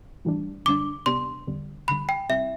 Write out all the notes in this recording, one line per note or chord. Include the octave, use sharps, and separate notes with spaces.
A2 E3 G3 D4
F#2 D3 G3 D4 D6
C3 G3 B3 D4 C6
E2 D3 G3
D2 D3 G3 B5
G5
C3 G3 C4 E4 E5